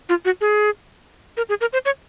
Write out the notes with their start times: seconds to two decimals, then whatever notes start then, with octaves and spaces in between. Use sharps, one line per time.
0.09 F4
0.25 F#4
0.41 G#4
1.37 A#4
1.49 G#4
1.61 A#4
1.73 C5
1.85 C#5